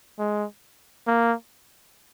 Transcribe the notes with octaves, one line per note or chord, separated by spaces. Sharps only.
G#3
A#3